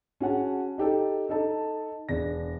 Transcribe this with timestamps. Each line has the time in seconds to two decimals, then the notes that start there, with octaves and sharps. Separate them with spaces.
0.20 C#4 F#4 G#4 F#5 A5
0.78 D#4 G4 A4
1.29 D#4 A4 D#5 A5
2.08 E1 D4 A#6